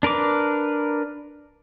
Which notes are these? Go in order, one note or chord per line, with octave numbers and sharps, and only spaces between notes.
D4 A#4 B4 D6